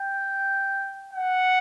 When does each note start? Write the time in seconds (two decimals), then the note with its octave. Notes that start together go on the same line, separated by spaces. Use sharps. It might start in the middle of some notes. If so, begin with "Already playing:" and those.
Already playing: G5
1.13 F#5